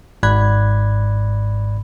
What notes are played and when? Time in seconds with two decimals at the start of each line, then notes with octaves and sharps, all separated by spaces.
0.23 G#1 G#2 D5 B5 F#6 G#6